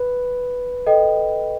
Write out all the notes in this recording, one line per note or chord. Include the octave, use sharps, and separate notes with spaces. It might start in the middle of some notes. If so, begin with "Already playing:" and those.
Already playing: B4
A4 D#5 G5